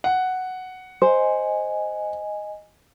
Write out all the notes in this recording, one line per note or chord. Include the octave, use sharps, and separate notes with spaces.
F#5
C5 D#5 G#5